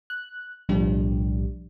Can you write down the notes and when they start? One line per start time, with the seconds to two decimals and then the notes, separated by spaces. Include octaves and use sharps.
0.10 F#6
0.69 B1 A2 F3 G3 D4 G4